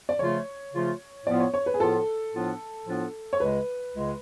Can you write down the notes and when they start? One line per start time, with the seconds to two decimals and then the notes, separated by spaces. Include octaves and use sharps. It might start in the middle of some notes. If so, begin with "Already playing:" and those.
0.09 D5
0.19 C#3 F3 A3 F4 C#5
0.73 C#3 F3 A3 F4
1.26 A2 F3 B3 F4 D5
1.40 C#5
1.54 C#5
1.66 B4
1.74 G#4
1.80 A2 F3 B3 F4 A4
2.33 A2 F3 B3 D4 F4
2.87 A2 F3 B3 D4 F4
3.33 C#5
3.40 C#2 C#3 G#3 B4
3.94 C#2 C#3 G#3